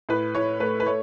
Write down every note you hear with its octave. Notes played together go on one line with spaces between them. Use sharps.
A2 B4
A2 C#5
A3 B4
B4
A3 C#5